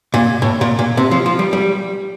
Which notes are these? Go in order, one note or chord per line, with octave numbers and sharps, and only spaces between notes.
A#2
A2
A#2
A#2
C3
F3
F3
G3
G3